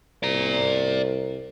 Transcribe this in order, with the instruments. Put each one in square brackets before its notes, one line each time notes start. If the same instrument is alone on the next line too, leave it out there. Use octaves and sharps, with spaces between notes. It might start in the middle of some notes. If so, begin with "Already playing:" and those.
[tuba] C2 [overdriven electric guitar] D5 A#5